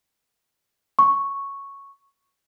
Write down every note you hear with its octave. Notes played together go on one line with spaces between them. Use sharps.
C#6